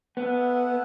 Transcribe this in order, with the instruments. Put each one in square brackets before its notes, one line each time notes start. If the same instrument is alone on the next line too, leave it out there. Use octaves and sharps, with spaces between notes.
[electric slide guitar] B3 [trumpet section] E4 A4 F#5